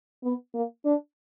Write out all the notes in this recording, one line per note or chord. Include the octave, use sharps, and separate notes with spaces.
B3
A#3
D4